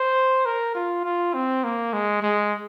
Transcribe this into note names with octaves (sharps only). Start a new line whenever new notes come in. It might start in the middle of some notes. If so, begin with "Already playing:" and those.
Already playing: C5
A#4
F4
F4
C4
A#3
G#3
G#3